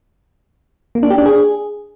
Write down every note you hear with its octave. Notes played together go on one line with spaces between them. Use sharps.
A#3
D4
G4
D4
G#4